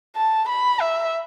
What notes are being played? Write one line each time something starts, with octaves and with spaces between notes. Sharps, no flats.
A5
B5
E5